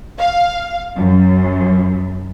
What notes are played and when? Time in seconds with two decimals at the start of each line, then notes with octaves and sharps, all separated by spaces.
0.19 F5
0.96 F#2